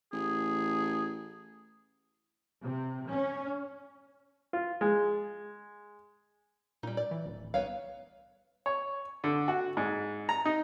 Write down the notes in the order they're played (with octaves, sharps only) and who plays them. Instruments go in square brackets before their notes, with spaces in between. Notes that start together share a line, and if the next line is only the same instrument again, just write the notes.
[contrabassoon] A1 [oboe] G#4
[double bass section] C3
C#4
[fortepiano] F4
G#3
[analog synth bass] A#2 [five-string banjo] G3 D#4
[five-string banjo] D5
[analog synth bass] E3
D1
[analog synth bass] C2 [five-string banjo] B3 C#5 F5
[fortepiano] C#5
D3
F#4
G#2
A#5
D#4